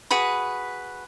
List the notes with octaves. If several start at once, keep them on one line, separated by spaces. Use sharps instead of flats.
F#4 G#4 B4 B5